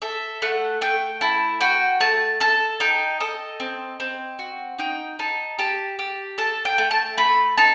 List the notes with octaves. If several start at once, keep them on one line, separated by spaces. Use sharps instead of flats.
A4 E5
A3 F#5
A3 G5
E4 A5
F#4 G5
A3 A5
A4 A5
D#4 G5
A4 D#5
C4
C4
F#4
D#4 G5
D#4 A5
G4 A5
G4
A4 A5
G5
A3
A5
A3 B5
D#4 A5